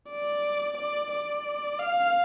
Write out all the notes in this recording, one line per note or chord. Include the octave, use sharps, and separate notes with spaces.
D5
D5
D5
F5